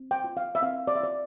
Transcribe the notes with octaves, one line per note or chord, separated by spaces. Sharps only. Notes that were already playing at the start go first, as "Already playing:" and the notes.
Already playing: C4
G5
F4
F5
E5
C4 F5
D5
E5
F4 D5